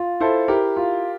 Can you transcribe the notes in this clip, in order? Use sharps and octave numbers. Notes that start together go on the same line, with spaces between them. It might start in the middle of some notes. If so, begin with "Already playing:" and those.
Already playing: F4
E4 A4 C5
E4 G4 A#4
F4